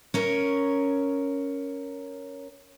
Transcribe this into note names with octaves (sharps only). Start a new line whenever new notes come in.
C#4 A#4 C#5